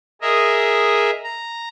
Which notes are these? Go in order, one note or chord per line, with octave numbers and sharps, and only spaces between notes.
G#4 A#4 D#5 E5
A#5